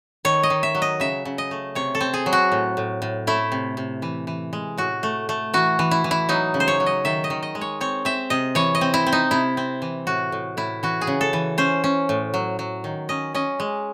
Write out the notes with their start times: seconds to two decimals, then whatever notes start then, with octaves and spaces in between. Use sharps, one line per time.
0.25 D#3 C#5
0.43 D#5
0.50 D#3
0.63 E5
0.75 F#3
0.82 D#5
1.00 C#3 E5
1.25 C#3
1.38 D#5
1.51 A3
1.75 C3 C#5
1.95 A4
2.01 C4
2.14 G#4
2.26 F#3
2.33 F#4
2.52 A2
2.77 A2
3.02 A2
3.27 A3 E4
3.52 C3
3.77 C3
4.02 E3
4.27 E3
4.53 G#3
4.78 A2 F#4
5.03 A3
5.29 A3
5.54 E3 F#4
5.79 E3
5.91 E4
6.04 E3
6.11 E4
6.29 F#3 D#4
6.54 C#3
6.60 C5
6.68 C#5
6.80 F#3
6.86 D#5
7.05 D#3 E5
7.24 D#5
7.30 D#3
7.43 D#5
7.55 G#3
7.61 C#5
7.81 C4 C#5
8.05 C4 E5
8.30 C3 D#5
8.55 E3 C#5
8.75 D#5
8.81 C4
8.94 E4
9.07 C4
9.12 D#4
9.31 C3 E4
9.57 C4
9.82 E3
10.07 A2 F#4
10.32 A2
10.57 A2 E4
10.83 E3 F#4
11.01 G#4
11.07 C#3
11.21 A4
11.33 E3
11.58 C#4 C5
11.84 C#4
12.09 A2
12.34 F#3
12.59 F#3
12.84 D#3
13.09 C#4 D#5
13.35 C#4 D#5
13.60 G#3